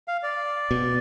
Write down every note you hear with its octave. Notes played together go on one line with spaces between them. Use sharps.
F5
D5
B2